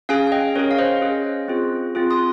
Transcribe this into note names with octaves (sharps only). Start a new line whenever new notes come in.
C#4 G#4 F5 G#5
G#5
D#5 G5
C#4 G#4 A#4 C#5
F5
C5 D#5
C#4 G#4
C4 F4 G#4
C4 F4 G#4
C6 D#6